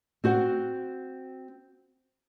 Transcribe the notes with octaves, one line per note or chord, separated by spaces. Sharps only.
C4 F#4 C5 F#5